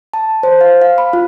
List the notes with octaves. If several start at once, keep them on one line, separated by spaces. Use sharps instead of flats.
A5
C5
F5
F5
B5
F4